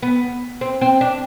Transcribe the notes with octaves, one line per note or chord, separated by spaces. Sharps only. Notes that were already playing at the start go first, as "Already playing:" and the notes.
B3
C4
C4
D4